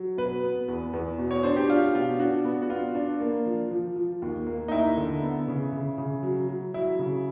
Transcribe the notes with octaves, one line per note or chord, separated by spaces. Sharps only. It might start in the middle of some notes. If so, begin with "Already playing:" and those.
Already playing: F#3
B2 B4
B3
E2
E2
B2
C#5
D4 C5
G4
D4 F4
B2 F4
D4 F#4
B3
F#4
B3 F4
D4
A#3
F3
F3
F3
D#2
A#3
D#4
D#2 E4
D3
B3
C#3
C#3
C#3
F#3
F#3
F#3 E4
C#3